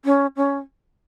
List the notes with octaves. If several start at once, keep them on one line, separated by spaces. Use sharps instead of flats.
C#4
C#4